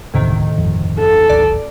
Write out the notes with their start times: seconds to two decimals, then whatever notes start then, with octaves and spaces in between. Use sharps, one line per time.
0.14 E1 C#2 A2 C3 D#3
0.58 G1 F2
0.99 A4
1.30 D1 G#1 D5